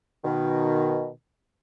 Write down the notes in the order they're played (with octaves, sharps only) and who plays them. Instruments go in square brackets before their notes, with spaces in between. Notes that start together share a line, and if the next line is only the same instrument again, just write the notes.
[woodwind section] B2 D#3